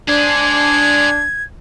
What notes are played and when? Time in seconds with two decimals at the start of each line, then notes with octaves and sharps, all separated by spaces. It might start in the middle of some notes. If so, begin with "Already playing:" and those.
0.09 D4 G#4 C5 G#6